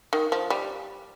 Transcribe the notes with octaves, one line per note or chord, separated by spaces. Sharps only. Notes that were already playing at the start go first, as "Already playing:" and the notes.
D#3
F3
G3